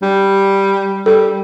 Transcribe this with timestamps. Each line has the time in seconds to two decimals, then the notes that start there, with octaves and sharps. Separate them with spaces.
0.03 G3
1.06 G3 A4